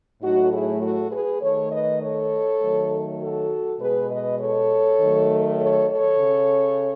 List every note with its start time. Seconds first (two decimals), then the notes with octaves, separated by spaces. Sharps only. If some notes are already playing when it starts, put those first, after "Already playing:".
0.21 A2 F#3 A3 D#4 F#4
0.51 E4 G#4
0.81 F#4 A4
1.11 G#4 B4
1.41 D#3 A3 A4 C#5
1.71 B4 D#5
2.01 A4 C#5
2.61 D#3 F#3 A3
3.20 F#4 A4
3.80 B2 G#3 G#4 B4
4.11 B4 D#5
4.40 A4 C#5
5.00 D#3 F#3 A3
5.60 A4 C#5
5.90 A4 C#5
6.20 C#3